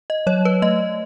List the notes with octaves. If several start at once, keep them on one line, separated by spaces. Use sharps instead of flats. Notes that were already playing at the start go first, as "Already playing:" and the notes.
D#5
F#3 C#5
B4
A3 D#5